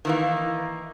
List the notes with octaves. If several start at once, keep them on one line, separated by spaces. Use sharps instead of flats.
D#3 E3 A#3